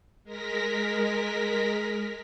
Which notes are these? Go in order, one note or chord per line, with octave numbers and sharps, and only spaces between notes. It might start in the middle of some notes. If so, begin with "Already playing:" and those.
G#3 A#4 A#6 B6